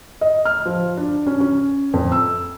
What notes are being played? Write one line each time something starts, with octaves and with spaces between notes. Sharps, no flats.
D#5
F6
F3
D4
C#4
C#4
F2
E6